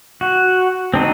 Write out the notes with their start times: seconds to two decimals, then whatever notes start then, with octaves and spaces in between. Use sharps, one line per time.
0.21 F#4
0.94 C4 D4 D#4 F#4